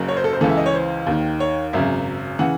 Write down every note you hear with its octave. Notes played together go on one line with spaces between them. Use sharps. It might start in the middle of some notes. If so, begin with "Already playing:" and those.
Already playing: F#1 F#2 C#3
C#5
C5
A4
C5
C#2 C#3 E3 A4
E5
D#5
C#5
C5
D#2 D#3
C#5
G#1 F#2 C#3 E5
C#3 E3 F#5